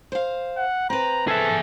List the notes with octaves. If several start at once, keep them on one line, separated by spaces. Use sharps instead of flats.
C5 F5
F#5
C4 B4 A#5
G#4 A4 E5